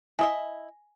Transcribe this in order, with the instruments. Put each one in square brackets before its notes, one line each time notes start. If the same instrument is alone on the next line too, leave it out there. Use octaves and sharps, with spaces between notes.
[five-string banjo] E4 D#5 E5 [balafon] G#5